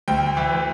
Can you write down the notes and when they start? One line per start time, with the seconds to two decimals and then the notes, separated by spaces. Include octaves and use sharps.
0.08 D2 G5
0.37 E3